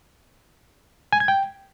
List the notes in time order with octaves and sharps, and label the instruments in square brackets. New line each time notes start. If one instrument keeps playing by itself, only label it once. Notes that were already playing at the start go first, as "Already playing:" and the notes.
[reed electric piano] G#5
G#6
G5